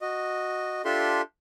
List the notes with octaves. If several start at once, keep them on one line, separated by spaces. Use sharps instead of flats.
F#4 D#5
D4 F4 G4 A4 E5 C6